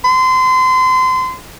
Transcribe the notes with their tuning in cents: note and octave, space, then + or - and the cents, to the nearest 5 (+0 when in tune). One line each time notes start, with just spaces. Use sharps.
C6 -30